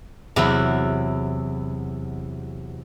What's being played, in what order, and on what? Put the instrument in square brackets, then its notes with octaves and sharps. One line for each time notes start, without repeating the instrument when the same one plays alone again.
[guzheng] E2 C3 F#3 E4